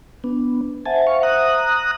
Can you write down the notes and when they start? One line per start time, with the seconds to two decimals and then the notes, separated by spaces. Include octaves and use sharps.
0.24 B3 D4
0.86 C5 E5 F#5 G#5 A5
1.07 F5 C#6
1.23 A#5 D#6 F#6